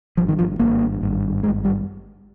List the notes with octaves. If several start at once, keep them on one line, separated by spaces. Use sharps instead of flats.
G#1 G2 F3
D#3
F3
G#1 G2 A#3
G#1 G2
G#1 G2 G#3
G3